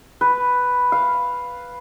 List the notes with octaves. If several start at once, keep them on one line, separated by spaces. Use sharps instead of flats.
B4
F5